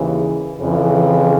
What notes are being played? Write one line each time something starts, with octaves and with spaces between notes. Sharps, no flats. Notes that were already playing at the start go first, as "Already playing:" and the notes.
Already playing: D#2 C#3 E3
F2 C#3 E3